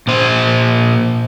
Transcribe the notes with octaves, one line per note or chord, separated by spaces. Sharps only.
A#2 C5